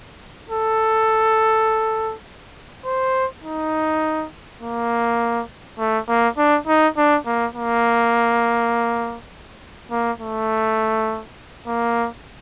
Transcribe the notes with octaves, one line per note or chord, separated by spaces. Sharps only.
A4
C5
D#4
A#3
A3
A#3
D4
D#4
D4
A#3
A#3
A#3
A3
A#3